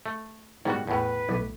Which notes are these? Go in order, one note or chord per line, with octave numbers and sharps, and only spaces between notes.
A3
G#2 D#3 G3 B3 F#4
E2 A2 B4
B1 A3